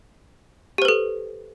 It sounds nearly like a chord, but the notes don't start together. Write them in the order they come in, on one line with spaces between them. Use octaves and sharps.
G4 C5 B4 A4